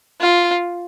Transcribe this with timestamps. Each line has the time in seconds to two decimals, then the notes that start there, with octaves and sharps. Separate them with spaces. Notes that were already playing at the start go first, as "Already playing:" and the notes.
0.21 F4